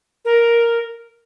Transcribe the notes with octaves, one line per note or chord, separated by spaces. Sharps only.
A#4